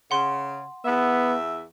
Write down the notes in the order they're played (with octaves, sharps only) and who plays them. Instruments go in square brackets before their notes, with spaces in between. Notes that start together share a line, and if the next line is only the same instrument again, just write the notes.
[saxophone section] C#3 [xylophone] F#5 C6
[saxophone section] E2 E5 [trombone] B3